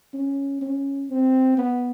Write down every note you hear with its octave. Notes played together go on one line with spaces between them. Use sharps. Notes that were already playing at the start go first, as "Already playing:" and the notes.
C#4
C#4
C4
B3